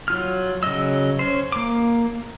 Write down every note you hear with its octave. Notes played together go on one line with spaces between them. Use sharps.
F#3 F4 F6
C#3 F#3 D#5 E6
C#4 C5
A#3 D6